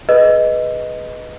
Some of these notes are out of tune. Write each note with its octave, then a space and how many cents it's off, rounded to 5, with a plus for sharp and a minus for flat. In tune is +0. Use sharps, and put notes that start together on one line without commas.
G#4 +30 B4 +0 D#5 +0